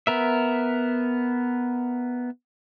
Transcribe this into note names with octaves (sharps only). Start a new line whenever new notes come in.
B3 A#4 E5